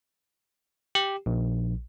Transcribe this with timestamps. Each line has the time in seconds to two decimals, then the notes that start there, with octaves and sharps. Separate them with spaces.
0.95 G4
1.26 A#1